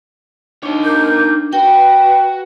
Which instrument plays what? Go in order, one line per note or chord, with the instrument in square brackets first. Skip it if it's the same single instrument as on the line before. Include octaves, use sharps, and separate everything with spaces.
[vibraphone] D4 [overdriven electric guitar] D#4 C#5
[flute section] A#4 D6 G6
[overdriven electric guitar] F#4 [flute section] B4 [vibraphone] G5